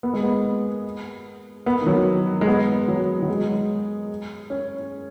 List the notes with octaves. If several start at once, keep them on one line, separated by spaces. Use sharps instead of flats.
B3
G#3
B3
B3
D#3
F#3
G#3
B3
F#3
F#3
G#3
C#4